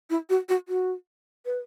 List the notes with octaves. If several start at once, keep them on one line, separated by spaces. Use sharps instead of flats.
E4
F#4
F#4
F#4
B4